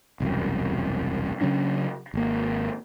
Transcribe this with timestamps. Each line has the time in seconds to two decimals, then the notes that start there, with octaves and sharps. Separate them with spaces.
0.20 E1 C2 F#2
1.41 C#3 F#3 C#4 D4
2.14 G#1 A#3